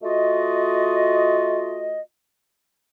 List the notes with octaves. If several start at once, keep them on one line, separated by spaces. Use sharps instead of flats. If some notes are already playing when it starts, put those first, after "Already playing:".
A3 F4 F#4 D#5